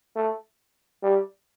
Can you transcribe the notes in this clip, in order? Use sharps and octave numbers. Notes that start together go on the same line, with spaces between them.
A3
G3